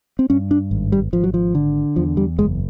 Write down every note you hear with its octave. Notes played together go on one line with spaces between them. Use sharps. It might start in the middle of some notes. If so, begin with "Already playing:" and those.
C4
G2 C#4
D4
G#1
G3
G#1 F3
F#3
F3
D3
E2 F3
G3
F#1 G#3